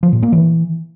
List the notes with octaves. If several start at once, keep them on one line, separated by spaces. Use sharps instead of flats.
F3
A#2
A#3
E3